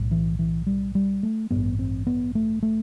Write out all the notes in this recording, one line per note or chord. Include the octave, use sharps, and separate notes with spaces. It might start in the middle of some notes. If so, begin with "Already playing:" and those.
Already playing: B1 A2
E3
E3
G3
G3
A3
A1 G2 B3
C4
B3
A3
A3